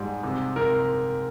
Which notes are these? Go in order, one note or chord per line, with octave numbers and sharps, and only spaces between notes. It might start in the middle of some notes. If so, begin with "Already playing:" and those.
Already playing: G#2 G3
C3
C3 A#4